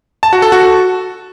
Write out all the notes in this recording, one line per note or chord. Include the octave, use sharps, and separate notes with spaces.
A5
F#4
A4
F#4